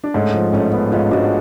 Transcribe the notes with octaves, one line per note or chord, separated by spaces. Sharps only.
D4
G#2 A3 C#4
F3
A1 A3 C#4
B3
G#2 C#4 F4
G#2 D4 F#4